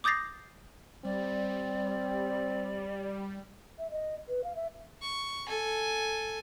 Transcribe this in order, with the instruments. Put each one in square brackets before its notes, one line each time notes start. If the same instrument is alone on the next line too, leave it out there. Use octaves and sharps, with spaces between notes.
[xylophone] D6 D#6 G6 A6 A#6 C7
[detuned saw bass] G3 [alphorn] C4 [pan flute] D5
[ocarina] E5
D#5
B4
F5
E5
[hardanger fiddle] C#6
A4 G#5